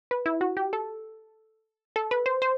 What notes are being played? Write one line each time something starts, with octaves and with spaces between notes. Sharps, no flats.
B4
E4
F#4
G4
A4
A4
B4
C5
C5